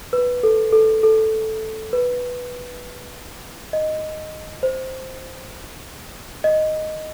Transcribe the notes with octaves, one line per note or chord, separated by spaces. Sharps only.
B4
A4
A4
A4
B4
D#5
C5
D#5